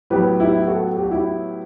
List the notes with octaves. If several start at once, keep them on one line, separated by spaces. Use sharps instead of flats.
A2 F#3 B3 G4 B4
E4 G4
F#4 A4
G4
F#4
E4 G4